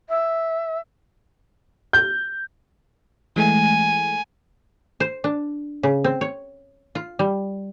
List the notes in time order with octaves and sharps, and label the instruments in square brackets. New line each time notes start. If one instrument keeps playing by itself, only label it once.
[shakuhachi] E5
[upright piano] G6
[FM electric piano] E3 G#3 A3 [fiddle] G#5
[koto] C5
D4
C#3
C4
C#5
F4
G3